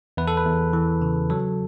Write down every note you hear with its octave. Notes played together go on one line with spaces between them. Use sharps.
E2 B4
A4
B4
E2
E3
C#3
F#3 A4